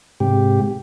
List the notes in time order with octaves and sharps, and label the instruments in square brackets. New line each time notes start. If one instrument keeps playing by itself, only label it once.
[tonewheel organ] G#2 C3 G4